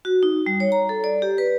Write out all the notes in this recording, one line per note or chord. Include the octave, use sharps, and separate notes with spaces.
F#4
D#4
G3
C#5
A#5
A4
D5
G4
B4